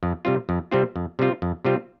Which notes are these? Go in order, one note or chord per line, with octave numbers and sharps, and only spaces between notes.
F2
C3 G3 C4 F4
F2
C3 G3 C4 F4
F2
C3 G3 C4 F4
F2
C3 G3 C4 F4